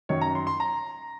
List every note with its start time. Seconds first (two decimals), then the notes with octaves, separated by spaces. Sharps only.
0.09 F#2 D#3 C#5
0.21 A#5
0.35 C6
0.47 C6
0.60 A#5